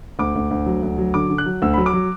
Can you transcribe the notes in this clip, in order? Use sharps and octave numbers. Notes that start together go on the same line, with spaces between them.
D2 D6
D2
D2
F#3
D2
F#3
D3 D6
D3
F#6
F#3
D2 E6
F#3 B5
D6
F#3